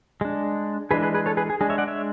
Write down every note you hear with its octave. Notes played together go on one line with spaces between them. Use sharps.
G#3 D4
E3 G#3 D4 G#4 B4
G#4 B4
G#4 B4
A4 C#5
G#4 B4
G#4
G#3 D4 G#4
C#5 E5
D5 F#5
C#5 E5